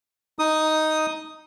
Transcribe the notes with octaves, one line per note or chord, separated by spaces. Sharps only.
D#4 D#6